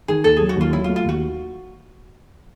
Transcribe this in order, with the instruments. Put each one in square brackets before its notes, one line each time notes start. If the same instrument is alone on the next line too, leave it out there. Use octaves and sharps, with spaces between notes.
[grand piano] D#3 [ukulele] G#4
[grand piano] D#2 [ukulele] A4
[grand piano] F#3 [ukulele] G#4
[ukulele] F#4
[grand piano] D#2 [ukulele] F4
[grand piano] F#3 [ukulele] E4
[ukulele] F4
[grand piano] A3
[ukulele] F4
[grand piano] D#2 [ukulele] F#4